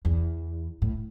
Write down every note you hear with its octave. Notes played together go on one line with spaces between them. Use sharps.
E2
A2